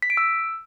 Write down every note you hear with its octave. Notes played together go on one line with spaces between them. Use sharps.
B6
D7
E6